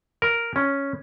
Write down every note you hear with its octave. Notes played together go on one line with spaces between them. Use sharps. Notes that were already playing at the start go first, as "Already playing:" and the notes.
A#4
C#4